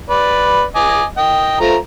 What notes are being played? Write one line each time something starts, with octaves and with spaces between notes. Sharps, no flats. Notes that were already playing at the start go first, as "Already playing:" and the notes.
B4 D5
D#5 G#5 D6
D#5 G5
F3 A3 A#5